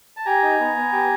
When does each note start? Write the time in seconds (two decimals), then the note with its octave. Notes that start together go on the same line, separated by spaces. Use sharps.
0.17 A5
0.25 G4 G#5 A#5
0.43 D#4
0.60 B3
0.76 B3
0.92 G4